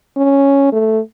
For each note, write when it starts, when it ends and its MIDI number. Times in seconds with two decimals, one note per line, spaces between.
0.17 0.69 61
0.72 0.99 57